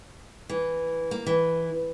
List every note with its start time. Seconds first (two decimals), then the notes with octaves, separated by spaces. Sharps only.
0.49 E3
1.11 A#3
1.27 E3